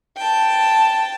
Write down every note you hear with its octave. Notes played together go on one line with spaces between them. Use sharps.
G5 A5